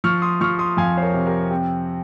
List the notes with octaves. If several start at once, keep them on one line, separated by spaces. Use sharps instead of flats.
F3 C#6 F6
C6 D#6
F3 C#6 F6
C6 D#6
F2 F5 G#5
C5
A#4 C#5
C3
G4 A#4
C4 G4